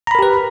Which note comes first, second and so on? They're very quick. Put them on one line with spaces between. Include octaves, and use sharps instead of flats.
A#5 B5 A#4 G4 B4